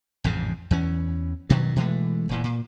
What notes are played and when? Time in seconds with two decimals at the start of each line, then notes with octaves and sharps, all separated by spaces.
0.24 A1 F2 G#2 C#3
0.71 E2 E3 C#4
1.49 G2 B2 D#3 F#3
1.76 B2 E3 G#3 A3
2.29 E1 A#2 E3
2.44 A#2